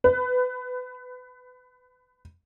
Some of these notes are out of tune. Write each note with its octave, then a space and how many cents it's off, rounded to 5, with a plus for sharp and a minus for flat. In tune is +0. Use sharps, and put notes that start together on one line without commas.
B4 +25